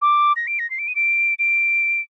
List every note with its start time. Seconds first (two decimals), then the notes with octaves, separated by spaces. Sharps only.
0.02 D6
0.36 A#6
0.47 D7
0.59 A#6
0.70 C7
0.79 D7
0.88 D#7
0.96 D7
1.39 D7